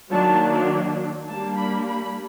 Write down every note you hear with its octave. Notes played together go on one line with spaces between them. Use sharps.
D#3 F#3 A#3 D4 A5
G3 A#3 D4 A5
B5
B5